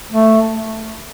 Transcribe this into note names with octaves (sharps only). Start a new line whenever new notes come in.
A3